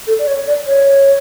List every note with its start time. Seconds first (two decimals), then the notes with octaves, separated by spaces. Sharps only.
0.07 A4
0.19 D5
0.27 C#5
0.47 D5
0.67 C#5